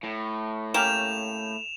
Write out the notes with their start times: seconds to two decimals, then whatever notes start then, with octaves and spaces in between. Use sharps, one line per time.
0.03 A2
0.74 A#3 C#4 G4 E7 F7